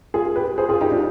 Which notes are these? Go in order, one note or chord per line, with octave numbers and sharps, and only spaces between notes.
F4 G#4
G4 B4
G#4 C5
F4 G#4
D#4 G4
D4 F4